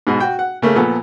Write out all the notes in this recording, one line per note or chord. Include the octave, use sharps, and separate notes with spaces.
G#2 B2
F#4 G5
F#5
C#3 A3 A#3
A#2 F3 B3 A4